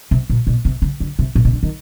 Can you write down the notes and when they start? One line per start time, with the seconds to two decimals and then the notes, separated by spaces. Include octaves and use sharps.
0.11 C3
0.30 A#2
0.47 B2
0.65 C3
0.82 C#3
1.00 D3
1.19 C3
1.35 A#2
1.45 B2
1.53 D3
1.63 D#3